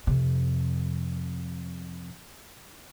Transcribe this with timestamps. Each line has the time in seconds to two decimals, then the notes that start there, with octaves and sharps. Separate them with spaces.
0.07 F2 C3